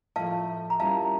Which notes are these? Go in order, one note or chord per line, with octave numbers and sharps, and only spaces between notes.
A2 F3 A3 F5 A5
A#5
A#2 G3 C#4 E4 F5 A5